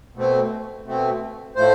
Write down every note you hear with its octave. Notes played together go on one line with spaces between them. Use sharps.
B2 A3 C4
B2 A3 C4
A2 F3 A3 C5